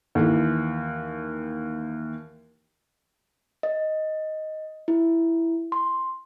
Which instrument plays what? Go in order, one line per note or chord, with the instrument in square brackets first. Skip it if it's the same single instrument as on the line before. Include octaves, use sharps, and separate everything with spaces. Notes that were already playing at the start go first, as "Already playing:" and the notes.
[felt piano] D#2 E3
[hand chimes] D#5
E4
C6